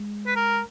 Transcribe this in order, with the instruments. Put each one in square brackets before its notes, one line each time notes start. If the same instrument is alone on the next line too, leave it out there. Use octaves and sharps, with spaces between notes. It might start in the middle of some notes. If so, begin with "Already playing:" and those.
Already playing: [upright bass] G#3
[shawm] B4
A#4